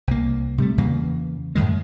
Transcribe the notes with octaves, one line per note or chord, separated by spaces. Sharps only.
C2 A#3
C3 G3 A3
E2 C#3 E3 A#3
F#2 A2 D#3 G#3